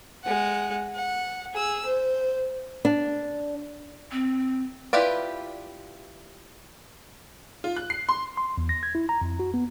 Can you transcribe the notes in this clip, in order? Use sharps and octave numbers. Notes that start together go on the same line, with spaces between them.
G#3 F#5
F#5
G#4 E6
C5
D4
C4
E4 F4 G4 B4 D5
F4
F#6
C7
C6
C6
E2
A#6
G#6
E4
A#5
F2
F#4
B3